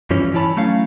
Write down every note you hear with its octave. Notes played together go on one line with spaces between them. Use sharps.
G2 E3 F3 C#4
E3 E4 C#5 A5 B5
F#3 A3 C#4 F5